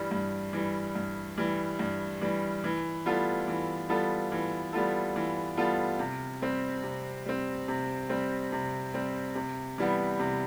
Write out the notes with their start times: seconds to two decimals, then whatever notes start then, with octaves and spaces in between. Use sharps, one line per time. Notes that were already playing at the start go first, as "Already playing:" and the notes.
Already playing: G2 E3 G3
0.11 G2
0.53 E3 G3
0.95 G2
1.38 E3 G3
1.79 G2
2.21 E3 G3
2.64 E3
3.06 G3 B3 F4 A4
3.48 E3
3.89 G3 B3 F4 A4
4.32 E3
4.73 G3 B3 F4 A4
5.16 E3
5.57 G3 B3 F4 A4
5.99 C3
6.42 G3 C4
6.84 C3
7.26 G3 C4
7.68 C3
8.09 G3 C4
8.52 C3
8.94 G3 C4
9.35 C3
9.78 E3 G3 B3
10.20 C3